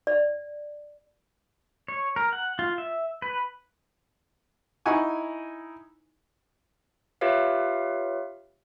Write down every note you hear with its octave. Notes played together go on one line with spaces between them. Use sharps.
D5
C#5
A#4
F#5
F4
E5
B4
D#4 E4 F#5 G#5 C#6
F4 G4 B4 C#5 E5 F5